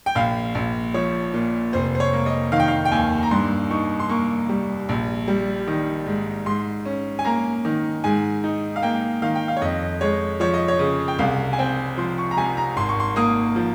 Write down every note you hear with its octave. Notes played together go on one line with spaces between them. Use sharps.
G5
A#1 F5
A#1
F3 C#5
A#2
F1 C5
C5
C#5
A#3
D#5
D#3 F5
G5
F5
G5
D#2 G#5
A#5
G2 C6
D#4 C#6
C6
A#3 C#6
G3
A#1
G3
D#3
G#2
G#2 C6
C#4
G#5
A#3 A#5
D#3
G#2 G#5
D#4
F5
A#3 G5
D#3 F5
G5
F5
C#5
F2 D#5
G#3 C#5
F3 C#5
D#5
C#5
C#3
G5
C2 F5
G#5
C4 G5
F3 C6
C#6
A#5
C3 G#5
A#5
G#1 C6
C#6
C6
A#3 D#6
F3